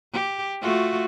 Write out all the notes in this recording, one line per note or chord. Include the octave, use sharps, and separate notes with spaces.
G4
A3 F4 F#4